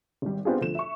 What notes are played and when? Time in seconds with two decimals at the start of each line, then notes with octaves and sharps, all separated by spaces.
0.22 G#1 G3
0.45 B3 C4 D4 F4 G4 G#4
0.61 D2 F3 A3 E7
0.75 E5 C#6